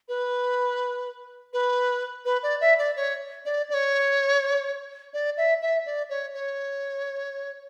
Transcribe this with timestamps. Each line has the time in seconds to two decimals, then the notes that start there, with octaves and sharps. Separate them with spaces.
0.08 B4
1.53 B4
2.25 B4
2.43 D5
2.61 E5
2.78 D5
2.96 C#5
3.45 D5
3.69 D5
3.74 C#5
5.13 D5
5.37 E5
5.61 E5
5.86 D5
6.09 C#5
6.34 C#5